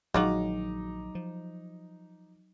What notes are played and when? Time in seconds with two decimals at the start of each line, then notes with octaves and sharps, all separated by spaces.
0.14 A#1 D#3 F#3 G#3 D#4 F4 F#4 D6
1.15 F3